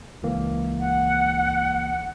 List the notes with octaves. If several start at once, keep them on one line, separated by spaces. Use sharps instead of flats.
C#2 E3 A#3
F#5